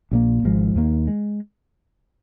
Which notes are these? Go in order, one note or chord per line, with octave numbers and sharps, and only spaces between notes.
A#1 A#2 A#3
G#1 G#2 F3 G#3
D#2 D#3 A#3
G#3